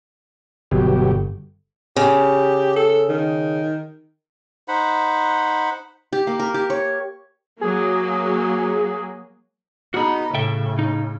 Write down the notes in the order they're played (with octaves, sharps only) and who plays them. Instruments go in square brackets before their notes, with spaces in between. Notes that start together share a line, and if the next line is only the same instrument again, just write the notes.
[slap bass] G1 [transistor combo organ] B2 F#3 G4
[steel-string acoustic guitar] C#3 [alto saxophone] G4
[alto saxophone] A4
D#3
[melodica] D#4 C5 F#5 B5
[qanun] G4
A#3
A#4
G4
C#5
[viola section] F#3 A#3 [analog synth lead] G#4
[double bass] B3 D#4 [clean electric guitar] F#4 G#4
[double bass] A2 C#3 [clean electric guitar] A4 E5 G5
[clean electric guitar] D#4